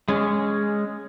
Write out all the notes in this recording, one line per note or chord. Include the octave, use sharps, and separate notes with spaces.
G#3 C#4